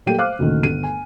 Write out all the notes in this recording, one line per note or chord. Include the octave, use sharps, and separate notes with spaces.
F#3 G3 A#3 A4 G5 D#7
C5 F5 D6 F6 F#6
F#1 D2 A#2 D#3
G1 D#7
G#5